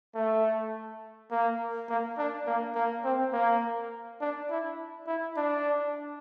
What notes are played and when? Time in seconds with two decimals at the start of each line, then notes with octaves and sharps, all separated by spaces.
0.15 A3
1.31 A#3
1.89 A#3
2.18 D4
2.47 A#3
2.75 A#3
3.04 C4
3.33 A#3
4.21 D4
4.50 E4
5.07 E4
5.37 D4